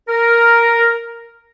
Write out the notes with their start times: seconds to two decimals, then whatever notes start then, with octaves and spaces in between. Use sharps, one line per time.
0.09 A#4